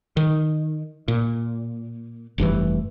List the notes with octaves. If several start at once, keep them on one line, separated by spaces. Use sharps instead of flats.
D#3
A#2
F1 G2 A#2 E3